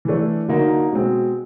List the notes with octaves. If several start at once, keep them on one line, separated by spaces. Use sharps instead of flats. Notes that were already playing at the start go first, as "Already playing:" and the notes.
E3 A3 D4
D3 F#3 A#3 D#4
B2 G#3 C4